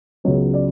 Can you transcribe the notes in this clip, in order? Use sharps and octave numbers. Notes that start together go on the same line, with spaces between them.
C#2 C#3 F#3 B3 C#5
D5